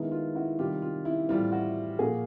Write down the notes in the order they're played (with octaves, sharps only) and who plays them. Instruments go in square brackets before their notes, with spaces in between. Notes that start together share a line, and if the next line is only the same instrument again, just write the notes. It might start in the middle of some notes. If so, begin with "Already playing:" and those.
Already playing: [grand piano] D#3 G#3 B3 E4
F4
E4 F#4
C3 D#3 G3 F4 G4
F4
E4
A2 E3 G3 C4 F4
E4 F#4
A#2 F3 A#3 F#4 G#4